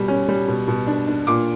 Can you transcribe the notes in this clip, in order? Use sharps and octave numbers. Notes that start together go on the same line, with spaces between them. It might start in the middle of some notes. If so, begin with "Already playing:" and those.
Already playing: B2 G3
C#4
G3
B2
B2
D4
D4
A#2 D6